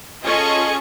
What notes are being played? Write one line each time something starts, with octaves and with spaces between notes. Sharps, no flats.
C#4 F4 G#4 A4 D#5 C#6